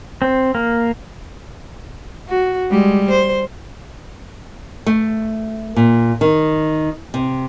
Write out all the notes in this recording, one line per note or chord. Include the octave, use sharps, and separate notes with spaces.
C4
A#3
F#4
G3 G#3
C5
A3
A#2
D#3
C3